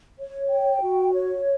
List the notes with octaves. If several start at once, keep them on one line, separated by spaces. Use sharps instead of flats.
C#5
G5
F#4
C#5